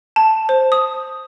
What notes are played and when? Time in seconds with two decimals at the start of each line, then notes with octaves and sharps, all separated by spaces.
0.16 A5
0.49 C5
0.72 D#6